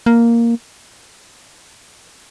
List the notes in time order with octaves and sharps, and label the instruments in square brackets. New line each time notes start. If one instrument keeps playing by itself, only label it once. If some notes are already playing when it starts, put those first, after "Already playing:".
[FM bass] A#3